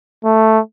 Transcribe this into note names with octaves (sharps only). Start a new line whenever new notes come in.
A3